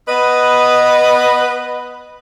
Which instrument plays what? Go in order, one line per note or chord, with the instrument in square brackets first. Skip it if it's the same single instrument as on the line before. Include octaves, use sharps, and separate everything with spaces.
[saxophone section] B3 B4 D#5